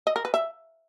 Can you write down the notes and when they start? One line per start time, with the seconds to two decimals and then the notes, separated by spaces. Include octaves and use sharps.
0.07 D#5
0.16 A#4
0.25 B4
0.34 E5